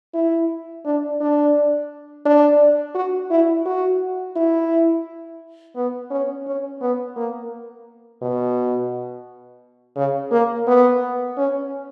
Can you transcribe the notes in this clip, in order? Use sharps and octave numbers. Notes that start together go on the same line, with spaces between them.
E4
D4
D4
D4
F#4
E4
F#4
E4
B3
C#4
C#4
B3
A#3
B2
C#3
A#3
B3
C#4